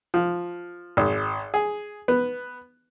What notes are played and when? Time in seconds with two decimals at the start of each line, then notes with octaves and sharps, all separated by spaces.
0.14 F3
0.97 G#1
1.54 G#4
2.08 B3